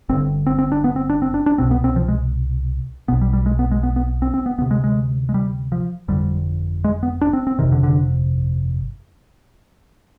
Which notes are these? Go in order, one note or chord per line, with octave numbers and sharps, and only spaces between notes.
G1 G2 D3 C4
C4
C4
D4
B3
C4
D4
C4
D4
D4
C2 B2 C4
B3
C4
F3
G#3
B1 B2 B3
G3
G3
G#3
B3
G#3
B3
B3
C4
C4
B3
D2 C3 B3
G#3
G#3
G#3
G3
F3
G1 F2 D3 G3
G#3
B3
D4
C4
C4
G1 F2 C3 D#3
D3
D3